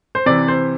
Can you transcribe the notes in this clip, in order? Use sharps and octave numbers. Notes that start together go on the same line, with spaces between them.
C5
C3 E3 D5
C5